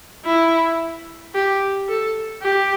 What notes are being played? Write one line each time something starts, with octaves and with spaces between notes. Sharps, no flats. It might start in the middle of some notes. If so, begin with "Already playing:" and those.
E4
G4
A4
G4